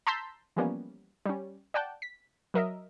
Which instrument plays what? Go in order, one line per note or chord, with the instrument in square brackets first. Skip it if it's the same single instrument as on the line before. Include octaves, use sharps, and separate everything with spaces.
[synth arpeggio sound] A5 A#5 C6 E6 G6 B6
E3 F3 G3 A#3 B3 C#4
G3 C#4
D5 F#5 G5 A5
B6
F#3 A#4 D#5 E5